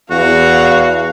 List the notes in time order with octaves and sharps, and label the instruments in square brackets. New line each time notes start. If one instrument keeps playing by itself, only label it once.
[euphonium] E2 [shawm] F#4 [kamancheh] F5